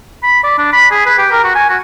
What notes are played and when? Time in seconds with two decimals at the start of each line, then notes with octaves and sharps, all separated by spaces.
0.23 B5
0.44 D5
0.58 D4
0.73 B5
0.91 G#4
1.06 B4
1.18 G4
1.31 A#4
1.44 F#4
1.55 G#5
1.69 F#4